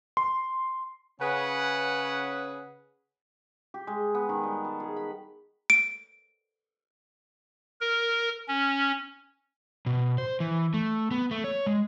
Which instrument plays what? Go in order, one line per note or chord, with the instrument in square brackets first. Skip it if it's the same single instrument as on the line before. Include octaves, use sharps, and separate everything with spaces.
[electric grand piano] C6
[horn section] C#3 C#4 G#4 B4 F#5
[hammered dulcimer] G4
G#3
B3
D#3
G3
A5
G#4
B5
[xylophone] D7
[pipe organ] A#4
C#4
[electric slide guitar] B2
C5
E3
A3
B3
A3
C#5
G#3